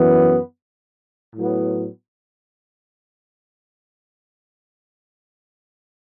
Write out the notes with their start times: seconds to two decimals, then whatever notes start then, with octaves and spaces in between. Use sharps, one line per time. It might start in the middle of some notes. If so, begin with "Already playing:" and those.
Already playing: F#2 E3 B3
1.35 A2 F#3 B3